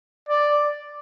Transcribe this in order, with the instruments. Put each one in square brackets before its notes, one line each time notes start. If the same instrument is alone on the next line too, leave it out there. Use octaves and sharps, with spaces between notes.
[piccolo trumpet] D5